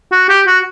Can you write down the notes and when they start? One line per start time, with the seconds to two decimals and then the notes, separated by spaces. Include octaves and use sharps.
0.12 F#4
0.29 G4
0.47 F#4